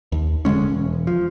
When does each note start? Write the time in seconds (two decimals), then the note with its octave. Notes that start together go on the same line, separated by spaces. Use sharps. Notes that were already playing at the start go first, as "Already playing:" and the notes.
0.12 D#2
0.45 F1 D3 G#3 C#4
0.70 E1
1.07 F3